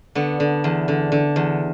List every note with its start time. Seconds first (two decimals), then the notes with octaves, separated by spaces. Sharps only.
0.15 D3 B3
0.40 D3
0.64 E2
0.88 D3
1.12 D3
1.36 E2